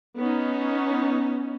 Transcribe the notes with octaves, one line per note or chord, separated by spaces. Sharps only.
B3 C#4 D#4